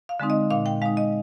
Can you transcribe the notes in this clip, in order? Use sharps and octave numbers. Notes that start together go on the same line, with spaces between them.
F5
D3 G#3 C4 D#4
D#5
A#2 F5
G5
G#3 D#4 F5
D#5